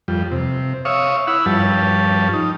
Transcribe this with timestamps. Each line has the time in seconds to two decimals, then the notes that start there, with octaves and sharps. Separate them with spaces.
0.08 F2 G3
0.32 C3
0.85 C#5 E5 F5 C#6 D#6
1.27 E4 F#5 B5 E6
1.46 G2 F3 G3 C#4 A5
2.33 D#4